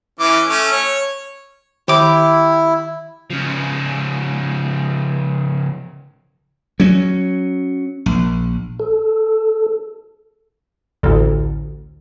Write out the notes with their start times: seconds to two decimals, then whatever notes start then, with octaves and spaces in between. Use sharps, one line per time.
0.20 E3 C#4 D6
0.47 A3 C#4
0.72 C#5
1.88 D#3 E4 G4 B5 D6
3.30 C#3 F3
6.80 F#3 C#4
8.06 A#1
8.80 A4
11.03 A1 D2